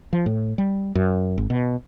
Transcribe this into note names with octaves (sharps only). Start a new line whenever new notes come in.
F3
A2
G3
F#2
G#1
B2